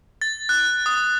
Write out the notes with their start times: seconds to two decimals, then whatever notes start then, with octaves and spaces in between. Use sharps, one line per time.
0.22 A6
0.49 F#6
0.86 D#6